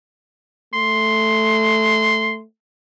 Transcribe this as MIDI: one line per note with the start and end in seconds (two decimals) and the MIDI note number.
0.74 2.44 57
0.74 2.38 84